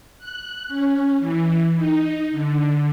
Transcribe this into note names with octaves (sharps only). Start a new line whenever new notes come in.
F#6
C#4
E3
D#4
D3